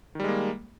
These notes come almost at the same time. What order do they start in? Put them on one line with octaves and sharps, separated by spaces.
D#3 G3 G#3 A#3